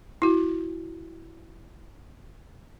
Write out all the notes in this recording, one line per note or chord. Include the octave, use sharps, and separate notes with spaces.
E4 F#4